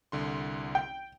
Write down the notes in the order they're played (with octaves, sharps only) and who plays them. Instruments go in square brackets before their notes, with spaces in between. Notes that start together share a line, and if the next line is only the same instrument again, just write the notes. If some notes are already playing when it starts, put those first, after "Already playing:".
[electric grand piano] C2 D3 C6
[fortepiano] G5